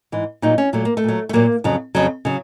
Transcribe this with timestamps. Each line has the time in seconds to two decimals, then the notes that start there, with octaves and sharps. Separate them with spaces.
0.12 G#2 E3
0.42 A#2 F#3 D#4
0.58 C#4
0.73 A#2 F#3 A3
0.85 A#3
0.97 A3
1.04 A#2 F#3
1.29 A3
1.33 A#2 F#3 A#3
1.64 F2 C#3 F#3
1.95 F2 C#3 F#3
2.25 C#3 F#3